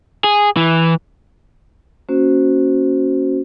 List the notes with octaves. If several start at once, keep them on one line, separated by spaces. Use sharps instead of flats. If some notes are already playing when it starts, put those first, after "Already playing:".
G#4
E3
A#3 C#4 F#4 C5